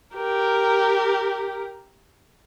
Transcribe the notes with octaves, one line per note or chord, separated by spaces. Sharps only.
G4 A#4